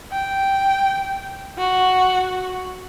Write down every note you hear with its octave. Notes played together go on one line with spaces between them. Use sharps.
G5
F#4